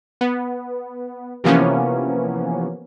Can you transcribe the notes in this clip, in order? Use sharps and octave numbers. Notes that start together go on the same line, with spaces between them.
B3
C3 E3 F3 A#3 B3 C#4